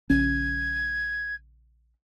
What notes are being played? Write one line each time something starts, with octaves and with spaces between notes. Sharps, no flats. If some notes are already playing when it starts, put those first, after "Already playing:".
A#1 C#3 C#4 G#6